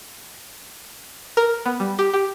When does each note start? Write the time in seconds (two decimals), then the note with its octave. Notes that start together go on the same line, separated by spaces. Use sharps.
1.37 A#4
1.66 B3
1.80 G3
1.99 G4
2.14 G4